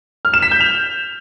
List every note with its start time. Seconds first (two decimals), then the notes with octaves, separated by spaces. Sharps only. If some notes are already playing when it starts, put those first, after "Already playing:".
0.25 F6
0.34 E7
0.42 B6
0.51 G6
0.60 F7